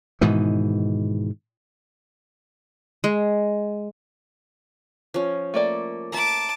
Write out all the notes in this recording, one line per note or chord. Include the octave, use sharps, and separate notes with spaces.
G#2 B2 D#3 E3
G#3
F3 C#4
A3 A#3 D5
E5 A5 A#5 D6